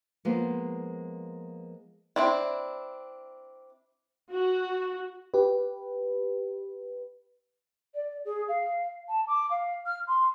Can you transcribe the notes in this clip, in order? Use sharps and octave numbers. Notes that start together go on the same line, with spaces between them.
F3 G#3 A#3 B3
C4 D4 E4
F#4
G4 B4
D5
G#4
F5
A5
D6
F5
F6
C6